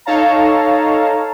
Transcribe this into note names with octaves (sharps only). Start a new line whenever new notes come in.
D#4 A4 C#5 F5 A5 A#5